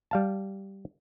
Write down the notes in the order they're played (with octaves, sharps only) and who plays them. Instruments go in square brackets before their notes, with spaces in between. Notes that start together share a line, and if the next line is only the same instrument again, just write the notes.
[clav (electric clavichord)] G3 F5 A5